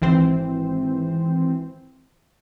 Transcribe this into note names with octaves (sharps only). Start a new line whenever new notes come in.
G#1 E3 C4 C5